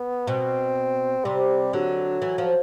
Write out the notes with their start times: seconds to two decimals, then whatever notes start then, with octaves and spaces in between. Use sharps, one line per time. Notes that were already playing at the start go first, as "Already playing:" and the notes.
Already playing: B3
0.27 B2 C4
1.25 C3 G3
1.73 D3 F#3
2.22 E3
2.38 F3